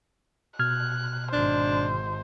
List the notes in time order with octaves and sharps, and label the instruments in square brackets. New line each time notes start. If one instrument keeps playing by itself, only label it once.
[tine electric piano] B2 F6 G#6 [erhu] F#6
[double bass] G#1 [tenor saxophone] D4 [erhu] C5